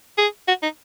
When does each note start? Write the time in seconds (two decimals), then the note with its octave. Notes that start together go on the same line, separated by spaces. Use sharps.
0.18 G#4
0.48 F#4
0.63 D#4